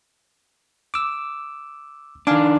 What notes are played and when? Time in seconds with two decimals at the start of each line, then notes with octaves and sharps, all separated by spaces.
0.94 D6 E6
2.27 D#3 D4 F5 G#5 D6